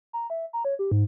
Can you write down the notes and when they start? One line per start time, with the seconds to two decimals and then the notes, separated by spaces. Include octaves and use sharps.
0.13 A#5
0.30 E5
0.53 A#5
0.65 C#5
0.79 G4
0.92 G#2